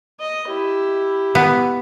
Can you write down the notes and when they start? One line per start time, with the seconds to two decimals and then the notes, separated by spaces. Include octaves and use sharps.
0.20 D#5
0.49 E4 G4
1.35 B3